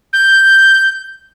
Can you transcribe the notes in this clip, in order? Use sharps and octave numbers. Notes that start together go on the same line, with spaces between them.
G6